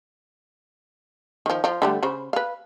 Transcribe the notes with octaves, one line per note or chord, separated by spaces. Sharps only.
D#3 F3
F3 F4
D3 G3 A3
C#3 C5 B5
B4 F5